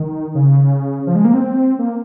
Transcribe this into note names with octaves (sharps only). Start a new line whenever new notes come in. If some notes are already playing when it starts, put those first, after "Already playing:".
Already playing: D#3
C#3
F3
G#3
A#3
C4
A#3